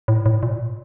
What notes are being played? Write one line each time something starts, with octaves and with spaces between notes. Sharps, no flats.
A2
A2
A#2